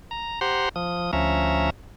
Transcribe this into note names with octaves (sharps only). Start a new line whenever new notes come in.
A#5
G4 C5 F#5 A#5 C6
F3 D#6
D2 F3 C#4 E5 A#5